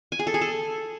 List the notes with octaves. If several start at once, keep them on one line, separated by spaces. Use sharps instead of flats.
G#5
G#4
A4
G#4
A4